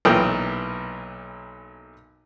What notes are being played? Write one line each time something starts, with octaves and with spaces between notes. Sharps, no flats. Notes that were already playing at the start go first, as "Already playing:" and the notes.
B1 A#2 E3 A#4 G5 D#6